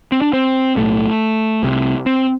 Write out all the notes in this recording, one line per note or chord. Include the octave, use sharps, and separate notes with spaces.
C4
D4
C4
B1 A2 A3
C2 C3
C4